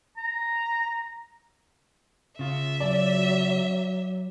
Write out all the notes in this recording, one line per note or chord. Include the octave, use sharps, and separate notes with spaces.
A#5
C#3 F4 E5
F#3 D5